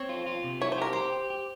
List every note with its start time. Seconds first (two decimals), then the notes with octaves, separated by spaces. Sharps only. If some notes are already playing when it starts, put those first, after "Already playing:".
Already playing: C4 C#5
0.09 F4
0.26 F4
0.44 C3
0.61 E4 C#5
0.72 C5
0.78 G4 A#4
0.93 G4 C5
1.12 G4
1.30 G4